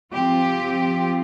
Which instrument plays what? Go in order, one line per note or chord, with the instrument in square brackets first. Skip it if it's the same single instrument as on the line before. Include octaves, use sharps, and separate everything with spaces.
[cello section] F3 C4 F4 G4